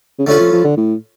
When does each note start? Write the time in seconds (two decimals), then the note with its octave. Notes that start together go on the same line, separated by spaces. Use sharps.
0.19 C#3
0.27 D3 A3 C#4 F4 B4
0.40 F3
0.52 F3
0.64 D3
0.77 A2